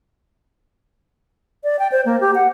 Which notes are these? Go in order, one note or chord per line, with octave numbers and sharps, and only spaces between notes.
D5
G5
C5
A#3
G4
F#5